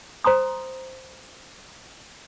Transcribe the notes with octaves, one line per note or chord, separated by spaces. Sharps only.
C5 A#5 C6 D#6